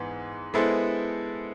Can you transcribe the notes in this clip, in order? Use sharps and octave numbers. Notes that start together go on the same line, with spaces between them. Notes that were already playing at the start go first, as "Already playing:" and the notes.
Already playing: G#2 E3 B3
G#3 B3 E4 A4 C5